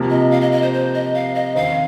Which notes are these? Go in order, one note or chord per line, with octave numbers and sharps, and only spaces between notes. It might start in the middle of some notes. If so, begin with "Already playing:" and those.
Already playing: C3 F3 A#3
D#5
F5
D#5
D#5
C5
C5
D#5
F5
D#5
D#3 C4 D#4 F5